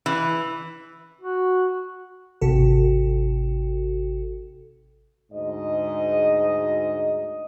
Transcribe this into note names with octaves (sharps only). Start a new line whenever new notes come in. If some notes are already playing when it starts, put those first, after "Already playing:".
E3
F#4
G#1 C3 F#4 A4
D2 G#2 D#5